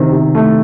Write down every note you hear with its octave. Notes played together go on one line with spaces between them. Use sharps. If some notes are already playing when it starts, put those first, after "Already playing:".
Already playing: C3 D#3
C3
A3